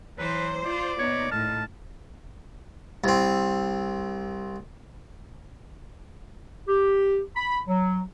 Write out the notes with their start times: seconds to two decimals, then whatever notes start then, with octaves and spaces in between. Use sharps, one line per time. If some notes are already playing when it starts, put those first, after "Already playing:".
0.18 E3 F#3 B4 C5
0.65 F4 D5
0.99 A#2 B3 D#4 C#5
1.31 A2 A5 F6
3.04 C2 C4
6.66 G4
7.35 B5
7.67 F#3